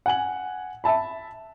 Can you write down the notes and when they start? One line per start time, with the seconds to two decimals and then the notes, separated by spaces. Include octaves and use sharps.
0.06 F#5 G#5 F#7
0.84 E5 A5 B5